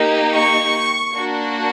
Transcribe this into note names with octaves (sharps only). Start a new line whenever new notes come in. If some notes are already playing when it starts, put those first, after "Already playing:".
Already playing: A#3 D#4 G4
C#6
A#3 D4 F#4